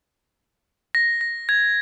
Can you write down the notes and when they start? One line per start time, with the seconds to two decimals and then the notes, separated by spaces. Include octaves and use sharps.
0.95 A#6
1.21 A#6
1.49 G#6